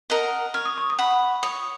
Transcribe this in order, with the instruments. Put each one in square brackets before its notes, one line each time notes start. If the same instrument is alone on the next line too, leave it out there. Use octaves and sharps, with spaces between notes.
[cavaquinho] A#4 D#5 F#5
[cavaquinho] C#5 [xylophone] F6
[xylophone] D#6
C#6
D#6
[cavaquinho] F#5 B5
[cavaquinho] C#5 [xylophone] D#6